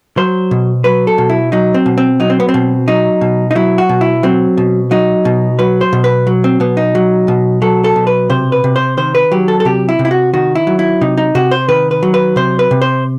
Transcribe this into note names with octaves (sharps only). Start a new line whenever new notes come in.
F#3 C5
B2
F#3 B4
A4
B2
E4
F#3 D#4
C4
B2
C4
F#3 D#4
C4
B3
C4
B2
F#3 D#4
B2
D#4
F#3 E4
F#4
B2
E4
F#3 C4
B2
F#3 D#4
B2
F#3 B4
C5
B2
B4
F#3
C4
B2 B3
D#4
F#3
B2
F#3 A4
A4
B2
B4
C3 C5
B4
C3
C5
D#3 C5
B4
F#3 G4
A4
A4
C3 G4
E4
C3
E4
F#4
D#3 F#4
E4
F#3
E4
C3 D#4
D#4
C3 F#4
C5
D#3 B4
B4
F#3
B4
C3 C5
B4
C3
C5